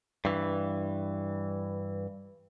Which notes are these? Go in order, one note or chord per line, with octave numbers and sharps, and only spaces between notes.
G2 E3